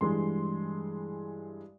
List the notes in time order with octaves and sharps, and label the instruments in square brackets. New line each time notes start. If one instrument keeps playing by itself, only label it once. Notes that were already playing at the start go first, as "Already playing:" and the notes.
[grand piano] G2 E3 G#3 C6